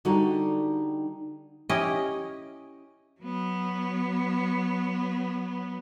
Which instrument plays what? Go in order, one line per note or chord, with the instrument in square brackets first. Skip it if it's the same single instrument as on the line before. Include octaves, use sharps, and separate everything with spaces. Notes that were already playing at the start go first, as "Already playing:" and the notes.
[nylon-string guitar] D3 G3 D#4 F#4 G4
[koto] C#4 E4 G4 D#5
[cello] F#3 B3